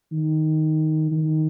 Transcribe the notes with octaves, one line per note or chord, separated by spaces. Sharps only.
D#3
D#3